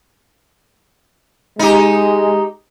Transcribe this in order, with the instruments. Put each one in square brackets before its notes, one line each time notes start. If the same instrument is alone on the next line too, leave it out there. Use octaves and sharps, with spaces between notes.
[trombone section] G#3 [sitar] D#4 G4